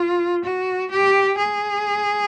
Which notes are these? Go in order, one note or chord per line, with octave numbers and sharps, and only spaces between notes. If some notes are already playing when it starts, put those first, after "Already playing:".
Already playing: F4
F#4
G4
G#4